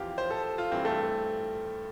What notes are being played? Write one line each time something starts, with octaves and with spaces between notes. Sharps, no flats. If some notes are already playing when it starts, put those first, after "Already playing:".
Already playing: F2 E3 F4 G4
C5
A4
F4
G2 E3 C4
A3